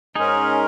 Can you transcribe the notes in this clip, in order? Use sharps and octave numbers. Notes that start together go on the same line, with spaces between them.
G#2 G#3 C#4 D#4 G#4 A#4